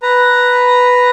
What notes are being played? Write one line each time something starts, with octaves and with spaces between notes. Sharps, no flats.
B4 A#5